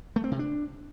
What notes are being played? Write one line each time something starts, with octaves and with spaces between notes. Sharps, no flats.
A3
C4
C3
D4